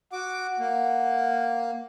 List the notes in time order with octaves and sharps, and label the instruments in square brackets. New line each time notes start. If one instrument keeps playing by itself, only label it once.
[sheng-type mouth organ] F#4 D6 [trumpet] F#5
[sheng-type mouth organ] A#3